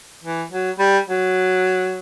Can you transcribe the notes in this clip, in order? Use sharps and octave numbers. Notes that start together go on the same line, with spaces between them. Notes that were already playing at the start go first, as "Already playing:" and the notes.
E3
F#3
G3
F#3